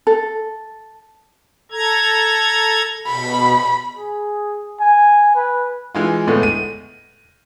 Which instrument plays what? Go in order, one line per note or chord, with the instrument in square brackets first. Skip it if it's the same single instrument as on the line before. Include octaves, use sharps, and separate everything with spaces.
[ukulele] A4
[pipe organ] A4 A#5 G#6
[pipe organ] B2 [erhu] B5
[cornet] G#4
G#5
B4
[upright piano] E3 G#3 F4
A2 D3 G#3 A3 B3
D#7